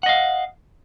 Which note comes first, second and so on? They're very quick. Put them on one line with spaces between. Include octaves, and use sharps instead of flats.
F#5 D#5 F5